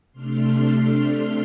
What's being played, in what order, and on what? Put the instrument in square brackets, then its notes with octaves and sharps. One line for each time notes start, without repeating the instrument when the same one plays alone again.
[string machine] C3 A3 D4 C6 F6